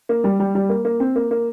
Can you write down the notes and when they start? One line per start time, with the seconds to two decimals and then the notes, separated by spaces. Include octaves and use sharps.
0.09 A#3
0.24 G3
0.40 G3
0.55 G3
0.69 A#3
0.85 A#3
1.00 C4
1.16 A#3
1.31 A#3